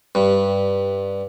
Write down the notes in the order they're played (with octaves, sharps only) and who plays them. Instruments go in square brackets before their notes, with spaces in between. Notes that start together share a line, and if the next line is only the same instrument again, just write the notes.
[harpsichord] G2